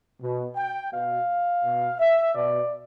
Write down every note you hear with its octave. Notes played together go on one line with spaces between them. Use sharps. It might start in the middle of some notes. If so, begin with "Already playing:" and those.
B2
G5
B2 F5
B2
E5
B2 D5